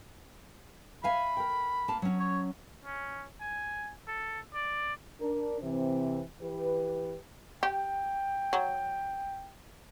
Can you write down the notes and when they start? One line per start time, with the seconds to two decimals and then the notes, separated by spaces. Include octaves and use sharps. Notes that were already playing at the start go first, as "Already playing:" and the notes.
1.04 E5 F5 G#5 B5
1.37 A#4 G5
1.88 A#3 A5
2.02 F#3 C#4
2.20 C#5
2.85 C#4
3.41 G#5
4.08 A4
4.54 D5
5.21 D4 A#4
5.61 C3 E3 C4
6.42 E3 G4 B4
7.63 G4 G5
8.53 F#3